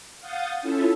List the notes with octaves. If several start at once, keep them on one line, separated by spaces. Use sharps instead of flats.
F5 F#5 D#6 G6 A6
C#4 E4 F4 A4 E5